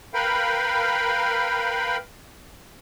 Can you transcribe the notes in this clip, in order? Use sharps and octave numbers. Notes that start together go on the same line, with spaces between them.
A#4 B4 F5 G5 B5